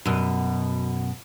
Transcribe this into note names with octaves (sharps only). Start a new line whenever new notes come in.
F#2 B2